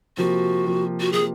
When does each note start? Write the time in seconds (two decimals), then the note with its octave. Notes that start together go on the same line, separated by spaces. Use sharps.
0.17 C3 F3 A#3 F#4
0.64 C3 F3 A#3
1.00 F#4
1.12 C3 F3 A#3 G#4